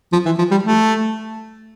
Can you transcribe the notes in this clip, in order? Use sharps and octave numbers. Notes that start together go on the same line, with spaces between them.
F3
E3
F3
G3
A3